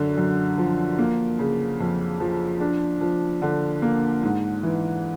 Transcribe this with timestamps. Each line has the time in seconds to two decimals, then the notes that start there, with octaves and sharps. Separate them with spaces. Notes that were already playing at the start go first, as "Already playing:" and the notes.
Already playing: F#2 D3
0.17 F#2
0.58 F3
0.99 A#3
1.39 C#3
1.80 F2
2.20 F3
2.60 D4
3.01 F3
3.42 D3
3.82 A#3
4.23 G#2
4.63 E3